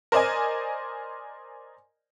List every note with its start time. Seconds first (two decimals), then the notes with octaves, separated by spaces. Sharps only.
0.12 A#4 C5 D5 D#5 G#5